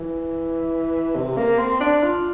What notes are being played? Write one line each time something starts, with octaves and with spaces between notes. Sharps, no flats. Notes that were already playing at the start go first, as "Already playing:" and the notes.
Already playing: E3
C3
A#3
C4
D4
F4